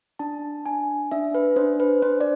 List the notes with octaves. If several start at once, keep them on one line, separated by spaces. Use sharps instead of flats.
D4 A5
D4 G#5
D4 E5
B4
D4 C5
B4
D4 C5
D5